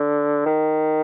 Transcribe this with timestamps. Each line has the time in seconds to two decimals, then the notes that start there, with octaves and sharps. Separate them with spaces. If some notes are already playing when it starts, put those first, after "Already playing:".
Already playing: D3
0.45 D#3